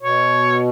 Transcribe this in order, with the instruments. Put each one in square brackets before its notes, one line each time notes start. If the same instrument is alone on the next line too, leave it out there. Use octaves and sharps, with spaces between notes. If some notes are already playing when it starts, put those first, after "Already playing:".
[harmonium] B2 [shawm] C#5